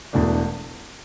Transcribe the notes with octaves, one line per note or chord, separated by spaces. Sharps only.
E1 E2 B2 A3 D4